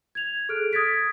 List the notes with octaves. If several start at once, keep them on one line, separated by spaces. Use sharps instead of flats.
G#6 F7
G#4 A4 F6 F#6 D7
D#6 G#6 A6 B6 D7